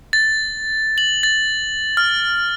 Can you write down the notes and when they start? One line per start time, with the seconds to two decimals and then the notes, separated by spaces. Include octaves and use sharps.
0.13 A6
0.98 F#7
1.23 A6
1.97 F6